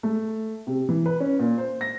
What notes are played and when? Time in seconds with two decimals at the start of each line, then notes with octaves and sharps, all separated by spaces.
0.03 A3
0.67 C3
0.89 E3
1.06 B4
1.20 C#4
1.39 A#2
1.58 C5
1.81 A#6